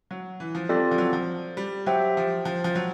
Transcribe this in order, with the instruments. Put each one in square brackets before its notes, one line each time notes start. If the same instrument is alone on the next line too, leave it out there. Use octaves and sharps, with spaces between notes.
[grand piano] F#3
E3
F3
[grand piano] G3 [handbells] C4 F4 A4 D5
[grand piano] F3
F#3
F3
G3
[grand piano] F#3 [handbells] G4 C5 E5 G5
[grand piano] F3
F3
F3
F#3